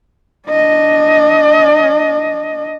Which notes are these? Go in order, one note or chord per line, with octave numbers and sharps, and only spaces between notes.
D4 D#5